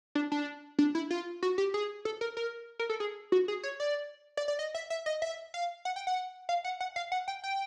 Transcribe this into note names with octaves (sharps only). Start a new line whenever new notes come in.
D4
D4
D4
E4
F4
F#4
G4
G#4
A4
A#4
A#4
A#4
A4
G#4
F#4
G#4
C#5
D5
D5
D5
D#5
E5
E5
D#5
E5
F5
F#5
G5
F#5
F5
F#5
F#5
F5
F#5
G5
G5